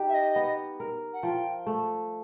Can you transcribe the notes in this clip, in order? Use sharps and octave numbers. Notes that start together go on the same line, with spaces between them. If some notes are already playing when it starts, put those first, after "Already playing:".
Already playing: D#4 G4
E5
D#5
B3
A#4
F#5
F3 G5
A3